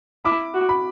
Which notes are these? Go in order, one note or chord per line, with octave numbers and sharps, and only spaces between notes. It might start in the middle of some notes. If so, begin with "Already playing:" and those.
E4 D6
F#4
B5